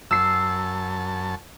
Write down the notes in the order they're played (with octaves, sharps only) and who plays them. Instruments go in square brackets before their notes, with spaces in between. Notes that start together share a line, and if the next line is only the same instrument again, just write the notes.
[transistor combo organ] F#2 A5 [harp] E6 C7